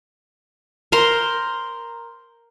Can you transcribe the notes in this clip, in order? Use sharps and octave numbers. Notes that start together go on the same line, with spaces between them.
A#4 C5 A#5 C6